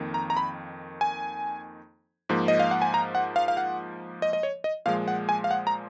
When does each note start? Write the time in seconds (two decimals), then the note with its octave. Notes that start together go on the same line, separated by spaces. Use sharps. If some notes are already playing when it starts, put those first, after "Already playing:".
Already playing: F2 D#3 A#3
0.14 A#5
0.30 A#5
0.37 B5
1.01 G#5
2.29 G#2 F3 A#3
2.48 D#5
2.60 F5
2.71 F#5
2.82 G#5
2.94 A#5
3.15 F#5
3.36 F5
3.48 F5
3.57 F#5
4.22 D#5
4.33 D#5
4.43 C#5
4.64 D#5
4.86 A#2 F3 G#3 F5
5.08 F#5
5.29 G#5
5.44 F5
5.51 F#5
5.67 A#5